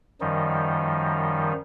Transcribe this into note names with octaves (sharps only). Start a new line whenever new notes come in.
F#2 D#3 F3 G3 D#4